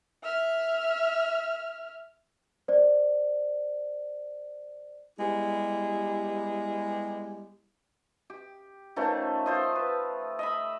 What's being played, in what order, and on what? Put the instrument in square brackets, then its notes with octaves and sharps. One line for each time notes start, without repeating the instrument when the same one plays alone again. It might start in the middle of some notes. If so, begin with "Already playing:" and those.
[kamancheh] E5 F6
[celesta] C5 D5
[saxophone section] G3 G#3 B3 E4 G4 G#4
[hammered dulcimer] G4
D#3 F3 A3 C#4
F4 C5 D#5
B4
D#5 E5 B5